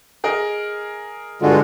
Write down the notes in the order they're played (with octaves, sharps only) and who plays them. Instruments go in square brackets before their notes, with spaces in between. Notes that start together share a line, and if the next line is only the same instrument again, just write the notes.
[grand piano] G#4 A#4 D#5
[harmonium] G2 F4 F#4 [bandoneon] D3 G#3